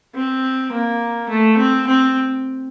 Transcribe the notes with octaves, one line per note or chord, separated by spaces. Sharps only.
C4
A#3
A3
C4
C4